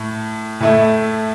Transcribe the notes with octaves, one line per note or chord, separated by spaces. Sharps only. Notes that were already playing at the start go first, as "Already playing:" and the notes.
Already playing: A2
A2 A3 E4